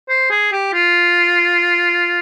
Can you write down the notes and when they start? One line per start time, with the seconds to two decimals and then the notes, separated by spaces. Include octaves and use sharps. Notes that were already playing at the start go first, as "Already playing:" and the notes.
0.09 C5
0.31 G#4
0.52 G4
0.73 F4